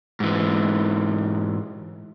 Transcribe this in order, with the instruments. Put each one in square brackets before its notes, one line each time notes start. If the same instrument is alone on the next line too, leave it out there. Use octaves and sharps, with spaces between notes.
[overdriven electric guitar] G#2 E3